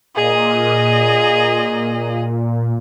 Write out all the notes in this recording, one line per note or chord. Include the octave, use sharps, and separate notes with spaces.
A#2 G#4 D#5